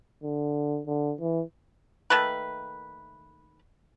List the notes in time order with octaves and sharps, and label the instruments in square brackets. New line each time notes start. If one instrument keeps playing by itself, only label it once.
[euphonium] D3
D3
E3
[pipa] D#3 A3 A#3 B4